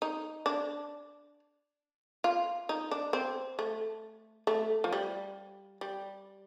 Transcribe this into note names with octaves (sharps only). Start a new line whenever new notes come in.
D#4
D4
F4
D#4
D4
C4
A3
A3
F3
G3
G3